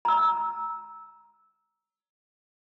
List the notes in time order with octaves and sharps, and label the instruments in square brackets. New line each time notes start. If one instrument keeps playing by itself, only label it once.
[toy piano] A#5 E6